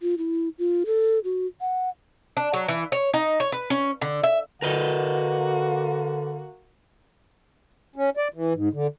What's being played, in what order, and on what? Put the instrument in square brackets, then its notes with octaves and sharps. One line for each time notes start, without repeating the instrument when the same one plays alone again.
[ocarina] F4
E4
F4
A4
F#4
F#5
[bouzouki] D4
F#3
E3
C#5
D#4
C#5
B4
C#4
D3
E5
[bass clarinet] D3 [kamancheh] A#3 F#4 [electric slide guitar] A#4 B4 D#5
[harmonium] C#4
D5
E3
G#2
D3